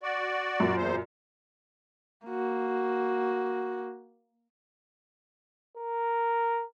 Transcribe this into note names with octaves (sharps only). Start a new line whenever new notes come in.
F#4 D5
F#2 A#2
E2 C5
A#3 F#4
A#4